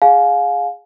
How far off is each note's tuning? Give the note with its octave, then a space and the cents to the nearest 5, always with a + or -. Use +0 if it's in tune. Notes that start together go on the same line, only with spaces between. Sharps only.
G#4 +0 F5 +25 G#5 +35